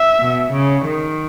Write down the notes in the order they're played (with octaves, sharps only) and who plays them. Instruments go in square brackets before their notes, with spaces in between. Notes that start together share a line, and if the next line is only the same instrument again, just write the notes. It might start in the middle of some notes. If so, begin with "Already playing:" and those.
Already playing: [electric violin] E5
[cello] B2
C#3
D#3